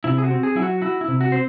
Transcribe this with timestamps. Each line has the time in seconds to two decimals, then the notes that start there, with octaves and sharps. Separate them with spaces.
0.04 C3 E4
0.18 G#4
0.24 F#4
0.31 C4
0.43 G#4
0.55 F#3 E4
0.63 F#4
0.82 E4 F#4
1.01 E4
1.08 C3
1.21 F#4
1.32 C4 C5